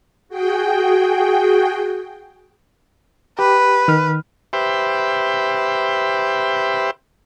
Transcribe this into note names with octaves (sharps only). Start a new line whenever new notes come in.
F#4 G#4 G5
G4 B4
D#3 F6
G4 B4 C5 E5